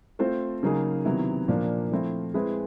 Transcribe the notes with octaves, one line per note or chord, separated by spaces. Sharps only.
A3 C4 F4 A4 C5
C#3 F#3 A#3 D#4 G#4
C3 D#3 F#3 B3 E4
A#2 F3 A#3 D4
F3 A3 C4 E4
G#3 C4 E4 G#4 B4